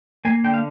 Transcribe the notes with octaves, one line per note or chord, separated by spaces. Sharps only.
A#3 G#5
D3 G5
F5